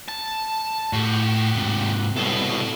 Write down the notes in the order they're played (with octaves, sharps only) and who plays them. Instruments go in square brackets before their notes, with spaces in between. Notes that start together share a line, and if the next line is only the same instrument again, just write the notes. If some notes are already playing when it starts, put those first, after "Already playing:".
[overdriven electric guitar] A5
[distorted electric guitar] A2 [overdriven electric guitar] F#4 G4
[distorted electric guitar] G#2 C3
[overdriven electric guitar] C2 B2 [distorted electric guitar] A4 C#5